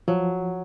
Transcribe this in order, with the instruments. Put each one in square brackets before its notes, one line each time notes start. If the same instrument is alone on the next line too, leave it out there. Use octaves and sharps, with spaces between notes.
[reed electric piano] F3 [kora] F#3